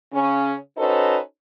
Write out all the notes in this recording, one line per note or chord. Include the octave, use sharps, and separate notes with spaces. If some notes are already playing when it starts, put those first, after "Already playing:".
C#3 C#4
C#4 D#4 F#4 A4 B4 C5